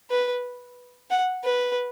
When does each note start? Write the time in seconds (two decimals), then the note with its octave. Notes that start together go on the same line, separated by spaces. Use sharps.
0.10 B4
1.10 F#5
1.44 B4